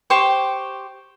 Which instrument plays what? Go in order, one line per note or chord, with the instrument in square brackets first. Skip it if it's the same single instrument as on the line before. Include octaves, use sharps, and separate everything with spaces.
[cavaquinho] G4 C5 G5 C#6